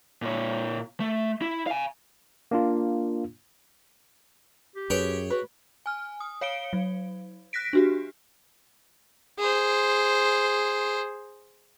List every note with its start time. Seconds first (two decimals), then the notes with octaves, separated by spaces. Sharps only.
0.22 A#2 C#5
1.00 A3
1.42 E4
1.67 F5 G#5
2.51 A#3 D4 F4
4.76 G4
4.90 F#2 G#4 B4 C#5 G5
5.30 F#4 B4
5.86 G#5 F6
6.20 D#6
6.41 C#5 F5 C#7 D7 G7
6.73 F#3
7.53 F#6 A#6 B6 D7
7.73 D4 F#4 G4
9.39 G#4 C5